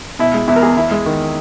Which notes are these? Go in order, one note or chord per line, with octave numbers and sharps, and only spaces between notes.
B2 E4
G#3
E2 E4
A#4
E2 G#4
E2 E4
G#3
D#3